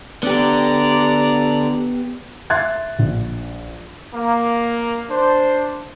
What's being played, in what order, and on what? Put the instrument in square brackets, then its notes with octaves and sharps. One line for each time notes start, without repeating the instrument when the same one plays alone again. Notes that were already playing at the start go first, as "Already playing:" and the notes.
[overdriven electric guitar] D3 [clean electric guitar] B3 G4 [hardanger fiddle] D5 A#5
[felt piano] E5 C6 F#6 G#6 A6
A#1
[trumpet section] A#3
D4 C5